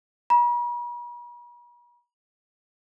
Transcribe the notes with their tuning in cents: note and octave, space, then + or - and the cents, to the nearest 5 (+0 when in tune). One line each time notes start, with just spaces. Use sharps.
B5 -45